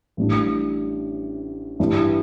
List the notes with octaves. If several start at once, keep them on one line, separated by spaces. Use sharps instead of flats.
A1 A2 G3 D4
G2 E3 G3